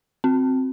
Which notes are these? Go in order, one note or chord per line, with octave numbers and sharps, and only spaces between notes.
C4